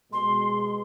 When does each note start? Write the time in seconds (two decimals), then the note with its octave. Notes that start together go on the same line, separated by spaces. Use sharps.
0.12 B2 G#3 C6